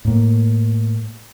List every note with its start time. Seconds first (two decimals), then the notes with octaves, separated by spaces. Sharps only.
0.05 A2 A#3